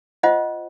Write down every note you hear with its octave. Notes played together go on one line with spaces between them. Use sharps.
F4 C5 D#5 F#5